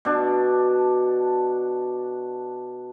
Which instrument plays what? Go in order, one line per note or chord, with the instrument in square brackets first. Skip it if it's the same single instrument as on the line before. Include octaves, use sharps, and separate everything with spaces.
[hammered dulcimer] B2 D4 A5